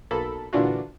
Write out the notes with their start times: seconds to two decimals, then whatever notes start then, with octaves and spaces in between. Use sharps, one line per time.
0.11 B1 A#3 A4 B5
0.53 A#2 D3 E3 D4 F4 F#4